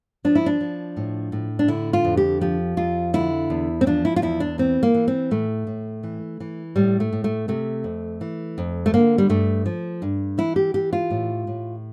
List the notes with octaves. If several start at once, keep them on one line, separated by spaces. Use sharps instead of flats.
F3 D4
E4
D4
F3
A2
A2
D4
D3 E4
F4
F2
G4
F3 G4
F2 F4
D3 E4
E2
C4
F3 D4
E4
F4
E2 E4
D4
E3 C4
A#3
E3
C4
A2 A3
A2
E3
E3
A2 G3
A3
A2
A3
C3 A3
F2
E3
F2
A3
D3 A#3
G3
G2 A3
F3
G2
E3 E4
G4
E3 G4
F4
A2
A2